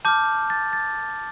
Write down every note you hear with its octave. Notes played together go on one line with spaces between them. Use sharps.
A5 D6 F6 G6
A6
A6